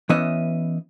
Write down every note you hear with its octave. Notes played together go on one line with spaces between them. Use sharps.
E3 B3 C#4 D#5 E5